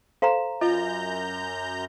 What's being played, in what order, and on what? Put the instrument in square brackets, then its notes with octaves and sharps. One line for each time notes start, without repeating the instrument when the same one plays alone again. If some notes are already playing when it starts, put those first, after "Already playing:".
[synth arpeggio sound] A4 C5 C6 [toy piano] F5 A#5
[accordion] F#2 A#5 G6 [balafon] F4 [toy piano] D#5